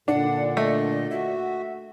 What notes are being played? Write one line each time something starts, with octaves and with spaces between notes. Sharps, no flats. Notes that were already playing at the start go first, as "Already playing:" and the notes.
A#2 D3 D4 F#5
A3 D#5
F#4 E5